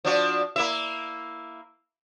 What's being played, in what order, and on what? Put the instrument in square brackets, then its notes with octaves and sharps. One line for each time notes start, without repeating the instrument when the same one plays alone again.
[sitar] F3 D4 F#4
A#3 E4 E5